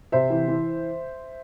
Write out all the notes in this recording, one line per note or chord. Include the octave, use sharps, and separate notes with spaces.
C3 C5 E5
E3
E3